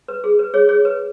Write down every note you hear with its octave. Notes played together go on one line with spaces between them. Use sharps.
B4
G#4
B4
G#4 C#5
G#4 C#5
B4